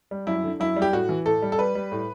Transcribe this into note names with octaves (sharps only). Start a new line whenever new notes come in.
G3
F#2 E4
D3
F#2 E4
G3
G4
A2 F#4
E3
A2 A4
G3
A4
G3 B4
G3
A2